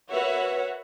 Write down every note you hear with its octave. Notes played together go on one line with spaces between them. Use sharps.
F#4 A#4 B4 C#5 E5 F#5